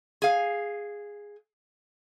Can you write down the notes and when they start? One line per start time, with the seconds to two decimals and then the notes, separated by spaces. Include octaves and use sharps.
0.22 G#4 F5